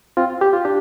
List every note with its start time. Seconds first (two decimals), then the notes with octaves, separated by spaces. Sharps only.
0.17 C4 F4
0.41 G4
0.53 F4
0.65 D4 G4